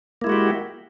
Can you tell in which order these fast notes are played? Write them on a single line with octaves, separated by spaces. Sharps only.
A#3 E4 G#3 F#4 G4